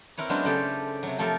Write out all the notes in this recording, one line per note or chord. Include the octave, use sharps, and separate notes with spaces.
C4 E4 A#4 B4 C#5
F#3 G#3 B3 C#4 D4 C5
C#3 A3 G4 A4 C5
C3 F#3
F3 A3 G4 A4 A#4